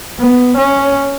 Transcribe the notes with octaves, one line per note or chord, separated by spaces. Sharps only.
B3
C#4